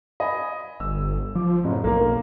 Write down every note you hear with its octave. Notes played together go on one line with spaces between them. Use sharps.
D#5 G#5 B5
G1 E6
F3 D6
F#1 A2
B1 A#3 A#4